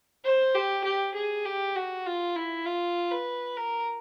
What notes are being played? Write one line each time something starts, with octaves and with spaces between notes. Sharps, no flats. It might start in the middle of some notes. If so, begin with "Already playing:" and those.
C5
G4
G4
G#4
G4
F#4
F4
E4
F4
B4
A#4